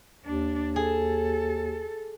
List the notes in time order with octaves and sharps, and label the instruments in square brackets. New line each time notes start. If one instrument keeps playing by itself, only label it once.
[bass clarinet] D#2 [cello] D4
[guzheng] G#4 [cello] A4